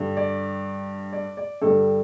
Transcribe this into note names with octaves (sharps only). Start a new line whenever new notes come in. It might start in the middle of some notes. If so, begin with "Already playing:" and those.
Already playing: G2 D3 G3
D5
D5
D5
G2 D3 G3 A4